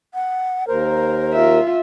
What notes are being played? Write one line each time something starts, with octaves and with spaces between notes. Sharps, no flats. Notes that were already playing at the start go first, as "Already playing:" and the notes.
F#5
D#2 A#4 C5
F4 E5